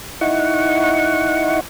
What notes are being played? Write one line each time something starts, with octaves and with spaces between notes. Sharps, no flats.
D#4 E4 F#5 C#6